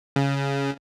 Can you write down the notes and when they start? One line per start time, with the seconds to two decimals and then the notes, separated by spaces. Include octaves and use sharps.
0.16 C#3